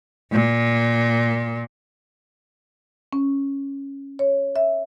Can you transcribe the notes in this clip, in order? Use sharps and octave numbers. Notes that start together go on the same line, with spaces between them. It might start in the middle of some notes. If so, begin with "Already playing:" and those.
A#2
C#4
C#5
E5